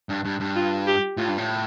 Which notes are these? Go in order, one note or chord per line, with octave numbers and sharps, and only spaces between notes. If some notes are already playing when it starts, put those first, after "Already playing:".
G2
G2
G2
F4
G4
A2 F4
G2
A2